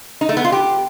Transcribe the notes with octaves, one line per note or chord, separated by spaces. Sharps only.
D#4
A3
B3
F4
G4